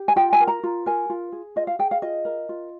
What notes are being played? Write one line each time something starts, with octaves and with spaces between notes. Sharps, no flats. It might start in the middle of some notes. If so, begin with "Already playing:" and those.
Already playing: G4
G#5
F4 G5
G#5
A#4
A#5
F4
A#4 G#5
F4
G#4
F4 D#5
F5
G#4 G5
F5
F4 D#5
A#4
F4